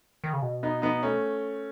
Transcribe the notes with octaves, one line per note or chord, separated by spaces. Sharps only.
D#3
C#3
B2
B3 D#4
B3 D#4
A3 C#4